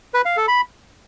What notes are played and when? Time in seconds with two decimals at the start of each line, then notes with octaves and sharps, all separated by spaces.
0.14 B4
0.25 F5
0.37 A4
0.48 B5